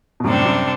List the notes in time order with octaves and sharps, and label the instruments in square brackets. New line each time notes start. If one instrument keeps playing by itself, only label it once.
[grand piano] B2
[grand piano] F#2 A2 [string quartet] C3 G3 D4 A4
[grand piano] F#2